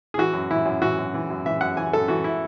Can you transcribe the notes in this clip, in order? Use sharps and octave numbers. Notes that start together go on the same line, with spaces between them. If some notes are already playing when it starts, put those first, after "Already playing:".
G#4
E3 F#4
F#2
E3 E4
F#2
E3 F#4
F#2
E3
F#2
E3 E5
F#2 F#5
E3 G#5
F#2 A4
E3 F#4
E4